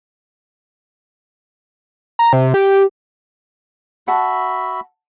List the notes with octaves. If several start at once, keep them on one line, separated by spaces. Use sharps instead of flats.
A#5
C3
G4
F#4 E5 F#5 A5 B5